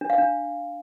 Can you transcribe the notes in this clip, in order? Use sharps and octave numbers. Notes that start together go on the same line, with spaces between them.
D4
F5
D4